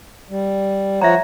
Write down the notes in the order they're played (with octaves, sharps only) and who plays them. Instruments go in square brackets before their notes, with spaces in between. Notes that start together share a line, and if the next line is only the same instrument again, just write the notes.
[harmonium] G3
[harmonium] F3 C#5 F#5 [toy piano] E5 A#5